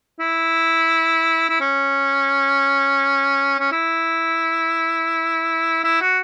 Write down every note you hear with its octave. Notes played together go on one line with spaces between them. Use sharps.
E4
E4
C#4
C#4
E4
E4
F#4